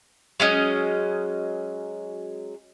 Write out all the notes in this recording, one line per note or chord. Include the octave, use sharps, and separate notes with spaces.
F#3 G#3 C#4 D#5